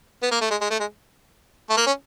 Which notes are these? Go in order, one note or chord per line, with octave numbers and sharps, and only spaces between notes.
B3
A#3
A3
G#3
G#3
A3
G#3
A3
A#3
C#4